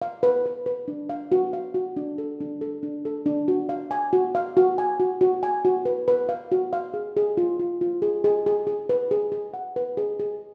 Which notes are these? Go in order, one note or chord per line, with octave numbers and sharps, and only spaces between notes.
F5
B4
B4
B4
D4
F5
F#4
F5
F#4
D4
A4
D4
A4
D4
A4
D4
F#4
F5
G#5
F#4
F5
F#4
G#5
F#4
F#4
G#5
F#4
B4
B4
F5
F#4
F5
G#4
G#4
F4
F4
F4
G#4
G#4
G#4
G#4
B4
G#4
G#4
F#5
B4
G#4
G#4